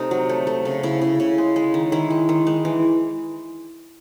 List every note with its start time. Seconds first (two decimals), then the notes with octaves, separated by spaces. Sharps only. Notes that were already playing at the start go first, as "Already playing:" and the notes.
Already playing: C3 A3 D#4
0.11 F#3
0.29 A3
0.47 A3
0.65 C#3
0.83 C#3 E4
1.02 C#3
1.20 C#3
1.38 G#3
1.56 G#3
1.74 D#3
1.92 D#3 E4
2.10 G#3
2.29 D#3
2.47 G#3
2.65 E3